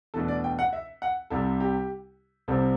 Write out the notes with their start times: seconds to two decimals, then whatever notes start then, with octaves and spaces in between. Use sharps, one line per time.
0.14 E2 B2 A3 D4 A4
0.28 D5
0.44 G5
0.59 F#5
0.73 E5
1.02 F#5
1.30 C2 C3 G3 A4
1.60 G4
2.48 C2 C3 G3 C4 A4